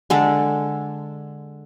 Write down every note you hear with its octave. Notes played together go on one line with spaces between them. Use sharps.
D3 G#3 A4